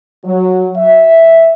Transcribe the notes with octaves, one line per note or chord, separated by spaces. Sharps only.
F#3
E5